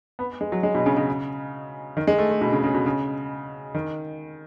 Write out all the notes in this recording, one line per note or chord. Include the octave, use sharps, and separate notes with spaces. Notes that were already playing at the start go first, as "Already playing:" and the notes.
B3
G#3
F#3
G#3
B2
C#3
C#3
D#3
G#3
A3
A3
B2
C#3
C#3
B2
C#3
D#3